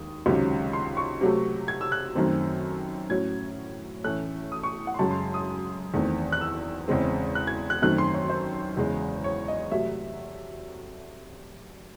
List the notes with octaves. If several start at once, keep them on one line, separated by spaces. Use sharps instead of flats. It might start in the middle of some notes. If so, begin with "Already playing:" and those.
Already playing: D#2 D#3 G#3 D#6
C#2 C3 D#3 F#3 C#4
C6
C#6
C3 F#3 A3
G#6
E6
F#6
F#2 D#3 A3 C4
A2 F#3 C#4 G#6
A2 E3 A3 C#4 F#6
D#6
C#6
F#5
C6
F#2 C#3 G#3 A5
C6
D#6
E2 D#3 A3 C4
F#6
E6
E2 C#3 G#3 C4
F#6
G#6
F#6
F#2 D#3 A3 C4 F#6
C6
C#5
C5
E2 C#3 G#3
C#5
D#5
C3 F#3 A3 E5